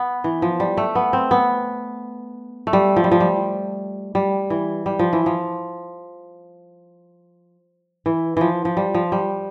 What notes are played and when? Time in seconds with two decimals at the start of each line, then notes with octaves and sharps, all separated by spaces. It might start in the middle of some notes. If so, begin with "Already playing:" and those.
Already playing: B3
0.24 E3
0.42 F3
0.60 G3
0.77 A3
0.95 B3
1.13 C4
1.31 B3
2.67 A3
2.73 G3
2.96 F3
3.04 G3
3.12 F3
3.20 G3
4.15 G3
4.50 E3
4.86 G3
4.99 F3
5.13 E3
5.26 F3
8.06 E3
8.37 E3 F3
8.65 F3
8.77 G3
8.94 F3
9.12 G3